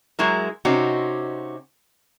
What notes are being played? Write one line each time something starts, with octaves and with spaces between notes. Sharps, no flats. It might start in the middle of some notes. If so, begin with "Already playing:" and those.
F#3 G#3 E4 A#4
C3 C4 C#4 D#4 F#4